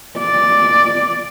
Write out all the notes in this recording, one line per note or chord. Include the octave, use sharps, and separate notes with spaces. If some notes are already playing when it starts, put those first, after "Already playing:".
D5